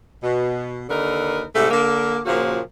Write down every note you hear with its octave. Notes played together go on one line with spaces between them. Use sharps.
B2
D#2 D3 D#4 A#4 B4
G#2 C3 G3 A3
D3 A#3
A#2 C#3 F3 A#3 F#4